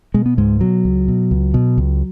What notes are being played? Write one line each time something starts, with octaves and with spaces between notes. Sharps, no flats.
B2 G#3
B3
C#2 G#2 G#3
B2 F#3
C#2
B2
C#2
B2
C#2